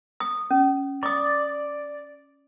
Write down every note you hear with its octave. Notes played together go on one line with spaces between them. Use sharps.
D#6
C#4
D5 D6 D#6